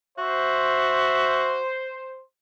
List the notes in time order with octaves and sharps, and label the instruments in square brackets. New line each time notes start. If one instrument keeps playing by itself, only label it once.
[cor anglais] F#4 [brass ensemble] C5 [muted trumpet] E5